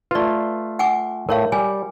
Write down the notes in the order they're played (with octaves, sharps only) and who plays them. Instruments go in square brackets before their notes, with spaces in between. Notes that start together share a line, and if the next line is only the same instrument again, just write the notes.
[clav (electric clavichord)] A3 F4 [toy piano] B4 D5
[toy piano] F#5 G#5 D6
[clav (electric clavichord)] A2 [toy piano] A#4 C#5 F5
[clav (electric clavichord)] G3 [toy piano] G#5